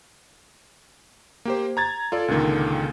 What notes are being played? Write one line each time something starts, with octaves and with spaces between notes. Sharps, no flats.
A#3 G4 C5
A#5 G#6 A6
F4 A4 D5
C#2 A#2 D3 D#3 A#3